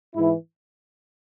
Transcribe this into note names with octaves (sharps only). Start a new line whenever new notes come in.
G#2 E3 E4